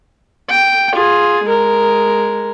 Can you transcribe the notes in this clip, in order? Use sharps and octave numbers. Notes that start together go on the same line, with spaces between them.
G5
F4 G#4
G#3 A#4